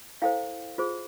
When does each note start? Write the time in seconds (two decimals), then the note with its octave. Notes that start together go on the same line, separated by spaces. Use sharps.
0.22 E4 A4 C5 F5 G5
0.78 F4 G#4 C5